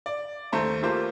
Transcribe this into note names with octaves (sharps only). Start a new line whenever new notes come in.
D5
D#2 A3 C5 A#5
A3 A#3 F4 G4 C5